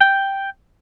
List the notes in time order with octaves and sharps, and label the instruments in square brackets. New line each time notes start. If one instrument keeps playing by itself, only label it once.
[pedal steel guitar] G5